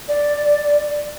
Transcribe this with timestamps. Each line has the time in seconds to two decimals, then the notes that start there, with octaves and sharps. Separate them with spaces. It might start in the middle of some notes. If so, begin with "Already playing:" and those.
0.08 D5